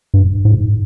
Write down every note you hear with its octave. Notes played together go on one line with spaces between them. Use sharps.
G2
G#2